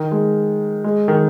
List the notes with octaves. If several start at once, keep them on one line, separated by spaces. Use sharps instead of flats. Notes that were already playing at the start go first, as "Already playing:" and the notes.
Already playing: D#3
G#3
G#3
D#3